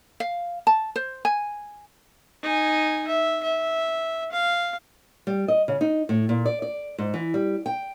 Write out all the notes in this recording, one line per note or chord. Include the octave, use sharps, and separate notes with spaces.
F5
A5
C5
G#5
D#4 G#5
E5
E5
F5
G3
D#5
C#3
D#4
A2
A#2
D5
D5
G#2
E3
G3
G5